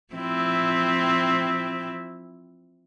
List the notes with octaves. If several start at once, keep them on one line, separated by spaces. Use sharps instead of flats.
F3 C4 E4